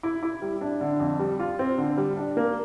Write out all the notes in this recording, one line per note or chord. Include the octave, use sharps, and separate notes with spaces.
E4
E4
G3
D4
D3
F2
G3
F4
C4
D3
G3
D4
A#3